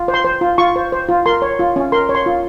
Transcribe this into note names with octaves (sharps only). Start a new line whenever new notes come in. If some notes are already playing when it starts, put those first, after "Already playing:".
Already playing: F4
C5
C6
C5
F4
F4 C#6
C5
C5
F4
A#4 C6
C#5
F4
C#4
A#4 C6
C#5
C6
F4